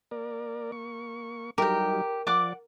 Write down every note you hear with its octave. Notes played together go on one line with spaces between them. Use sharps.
A#3 A#4 D5
A#3 C#6
F#3 G3 D#4 G4 A#4 G5
F3 D5 F#5 D6